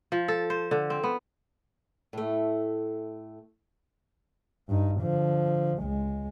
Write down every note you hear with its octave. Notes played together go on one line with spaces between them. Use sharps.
F3
A4
C5
D3
C4
B3
A2 A3
G2 D#4
D3 F3
C#2 G#3